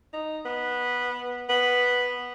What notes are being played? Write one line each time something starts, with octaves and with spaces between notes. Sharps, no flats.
D#4
B3
B3